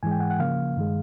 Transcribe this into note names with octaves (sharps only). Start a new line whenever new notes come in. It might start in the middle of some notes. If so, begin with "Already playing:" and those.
G#2 E3 G#3 G#5
G5
F#5
F#5
C#3 F3 A#3 F5
G2 D#3 G#3